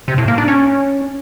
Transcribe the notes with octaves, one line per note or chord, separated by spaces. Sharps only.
C3
A2
A#3
D4
C#4